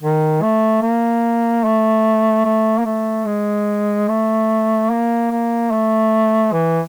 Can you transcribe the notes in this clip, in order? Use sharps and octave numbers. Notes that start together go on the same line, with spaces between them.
D#3
A3
A#3
A3
A3
A#3
A3
G#3
A3
A#3
A#3
A3
E3